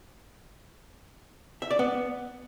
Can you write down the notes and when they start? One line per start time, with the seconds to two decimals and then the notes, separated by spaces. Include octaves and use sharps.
1.62 E5
1.71 D5
1.79 B3